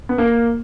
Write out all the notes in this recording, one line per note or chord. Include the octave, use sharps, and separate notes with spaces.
B3
A#3